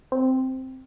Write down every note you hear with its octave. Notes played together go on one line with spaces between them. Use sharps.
C4